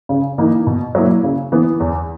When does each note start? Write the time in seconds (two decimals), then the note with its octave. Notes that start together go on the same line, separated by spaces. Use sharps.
0.09 C#3
0.38 E3 A#3 D#4
0.67 B2
0.95 F#3 A#3 E4
1.23 C#3
1.52 E3 B3
1.80 E2